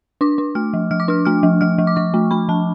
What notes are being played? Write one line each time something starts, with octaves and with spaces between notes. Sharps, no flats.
D4 D6
D4
A3 F6
F3
F3 F6
D6
D4 F6
A3 F6
F3
F3 F6
F3
D6
F3 C#6
A3
A3 B5
F3 A5